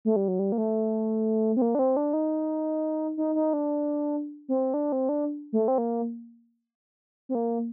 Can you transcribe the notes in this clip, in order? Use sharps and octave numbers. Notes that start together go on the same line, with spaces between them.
A3
G3
F#3
G3
A#3
A3
C4
A#3
D4
C4
D4
D#4
D#4
D#4
D4
C4
D4
C4
D4
A3
C4
A#3
C4
A#3